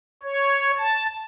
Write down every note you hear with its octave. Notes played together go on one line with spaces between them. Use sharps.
C#5
A5